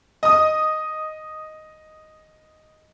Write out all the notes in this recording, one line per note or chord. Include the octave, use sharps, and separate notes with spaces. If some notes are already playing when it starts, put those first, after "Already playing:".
D#5 D#6